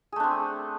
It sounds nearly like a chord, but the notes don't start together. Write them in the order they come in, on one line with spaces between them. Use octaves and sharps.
G#4 A3 D4 C4